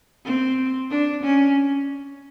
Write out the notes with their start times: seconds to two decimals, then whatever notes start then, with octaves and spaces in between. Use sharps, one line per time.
0.25 C4
0.90 D4
1.23 C#4